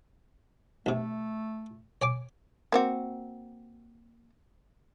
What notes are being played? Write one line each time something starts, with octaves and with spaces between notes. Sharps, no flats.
B1 C3 A3
C#5 G#5 D6
A#3 C4 F#4